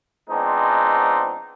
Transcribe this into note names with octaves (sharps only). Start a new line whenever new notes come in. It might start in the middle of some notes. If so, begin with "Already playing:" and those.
F3 G#3 B3 C4 D4 D#4